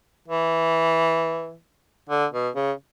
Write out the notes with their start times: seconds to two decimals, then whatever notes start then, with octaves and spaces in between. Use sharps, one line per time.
0.28 E3
2.10 D3
2.33 B2
2.56 C#3